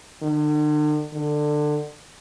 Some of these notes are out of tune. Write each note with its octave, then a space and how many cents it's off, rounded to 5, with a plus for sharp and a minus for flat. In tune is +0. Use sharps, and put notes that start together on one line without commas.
D3 +45
D3 +20